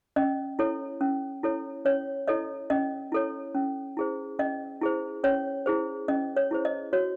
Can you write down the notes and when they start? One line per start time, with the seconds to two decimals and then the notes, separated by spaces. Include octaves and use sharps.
0.16 C#4 D#5
0.59 E4 A4 C#5
1.01 C#4
1.43 E4 A4 C#5
1.85 C#4 C#5
2.27 E4 A4 C#5 D#5
2.70 C#4 D#5
3.12 E4 A4 C#5
3.55 C#4
3.97 E4 G#4 C5
4.39 C#4 D#5
4.81 E4 G#4 C5
5.24 C#4 C#5
5.66 E4 G#4 C5
6.08 C#4 D#5
6.36 C#5
6.51 E4 G#4 C5
6.65 D#5
6.93 F#4 C#5